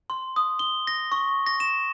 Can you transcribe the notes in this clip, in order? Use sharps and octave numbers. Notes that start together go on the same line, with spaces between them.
C6
D#6
G7
A#6
C#6
A#6
E7